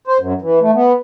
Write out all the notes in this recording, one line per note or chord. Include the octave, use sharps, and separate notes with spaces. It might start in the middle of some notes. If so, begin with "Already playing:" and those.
C5
F#2
E3
A3
B3